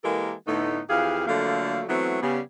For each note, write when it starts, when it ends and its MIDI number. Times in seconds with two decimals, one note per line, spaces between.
0.04 0.33 52
0.04 0.33 56
0.04 0.33 58
0.04 0.33 67
0.04 0.33 69
0.04 0.33 70
0.47 0.80 45
0.47 0.80 50
0.47 0.80 57
0.47 0.80 59
0.47 0.80 63
0.90 1.25 41
0.90 1.25 52
0.90 1.25 67
0.90 1.25 68
0.90 1.25 77
1.27 1.83 50
1.27 1.83 53
1.27 1.83 54
1.27 1.83 57
1.27 1.83 58
1.27 1.83 77
1.89 2.18 52
1.89 2.18 54
1.89 2.18 57
1.89 2.18 59
1.89 2.18 60
1.89 2.18 64
2.22 2.40 49
2.22 2.40 55
2.22 2.40 59